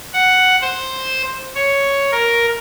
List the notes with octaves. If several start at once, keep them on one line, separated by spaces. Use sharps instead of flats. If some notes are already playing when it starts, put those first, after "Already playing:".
F#5
C5
C#5
A#4